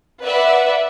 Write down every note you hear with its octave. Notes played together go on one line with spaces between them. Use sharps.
B4 D5 E5 F#5